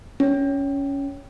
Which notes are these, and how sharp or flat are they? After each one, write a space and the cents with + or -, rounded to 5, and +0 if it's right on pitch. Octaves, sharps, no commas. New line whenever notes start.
C#4 +10